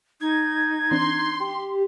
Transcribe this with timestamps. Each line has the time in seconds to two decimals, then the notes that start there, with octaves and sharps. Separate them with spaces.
0.21 D#4 G#6
0.91 E3 C4 D4 C6
1.40 G4